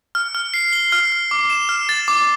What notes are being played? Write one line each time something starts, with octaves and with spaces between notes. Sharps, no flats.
F6
F6
C7
G7
F6
F6
D6
E7
F6
A6
D6